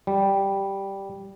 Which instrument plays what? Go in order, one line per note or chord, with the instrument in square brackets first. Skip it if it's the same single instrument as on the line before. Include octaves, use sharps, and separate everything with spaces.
[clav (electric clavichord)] G3